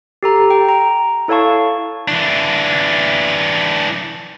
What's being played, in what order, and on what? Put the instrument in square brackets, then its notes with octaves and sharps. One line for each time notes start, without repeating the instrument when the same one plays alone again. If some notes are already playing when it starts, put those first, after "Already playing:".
[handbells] G4 A4 A#5
G5
A#5
E4 A4 C#5 F5 A5 C#6
[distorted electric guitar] E3 D4